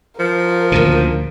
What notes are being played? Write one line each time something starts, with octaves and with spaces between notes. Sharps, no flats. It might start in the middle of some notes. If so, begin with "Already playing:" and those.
F3 A#4
D2 A#2 C#3